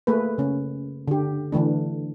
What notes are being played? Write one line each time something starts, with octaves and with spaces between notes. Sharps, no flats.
A3 A#3 G#4 B4
C#3 C#4
D3 G4
D3 E3 A3 D4